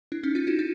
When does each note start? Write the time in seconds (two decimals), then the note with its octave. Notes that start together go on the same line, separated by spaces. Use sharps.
0.12 D4 E4
0.23 C#4 D#4
0.35 D#4 F4
0.47 E4 F#4
0.59 D#4 F4